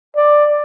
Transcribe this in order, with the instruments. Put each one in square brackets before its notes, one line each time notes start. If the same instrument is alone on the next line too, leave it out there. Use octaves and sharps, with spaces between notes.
[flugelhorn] D5